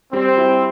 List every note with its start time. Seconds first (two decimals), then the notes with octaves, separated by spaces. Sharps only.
0.13 G3 C4
0.37 E4